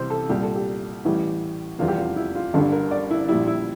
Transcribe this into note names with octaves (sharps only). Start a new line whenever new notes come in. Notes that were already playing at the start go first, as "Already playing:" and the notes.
Already playing: C2 C3 E3 C5
A4
C2 A#2 G3 G4
A4
G4
A1 A2 E3 G3
F1 E2 E3 G3 F4
G4
F4
E4
F4
G1 G2 D3 G3 A4
A#4
D5
E4
A#1 A#2 G3 E4
E4